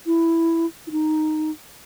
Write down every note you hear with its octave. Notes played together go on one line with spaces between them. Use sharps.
E4
E4
D#4